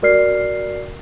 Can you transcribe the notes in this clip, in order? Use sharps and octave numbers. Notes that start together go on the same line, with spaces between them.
F#4 A#4 D5 F6 C7